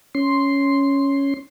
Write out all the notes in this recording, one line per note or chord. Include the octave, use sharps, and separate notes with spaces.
C#4 C6